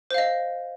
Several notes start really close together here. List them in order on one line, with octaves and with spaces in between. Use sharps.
C5 F5 D#5